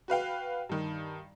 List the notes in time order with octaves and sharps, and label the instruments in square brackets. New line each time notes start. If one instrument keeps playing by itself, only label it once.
[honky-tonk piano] F#4 B4 F5 G5
G2 D#3